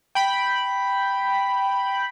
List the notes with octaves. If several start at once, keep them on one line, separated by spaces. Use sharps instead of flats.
G5 B5